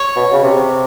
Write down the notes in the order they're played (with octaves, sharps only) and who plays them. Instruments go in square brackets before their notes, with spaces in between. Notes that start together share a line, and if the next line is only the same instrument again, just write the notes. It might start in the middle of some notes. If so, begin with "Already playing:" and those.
Already playing: [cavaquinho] C#5
[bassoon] B2
C#3
C3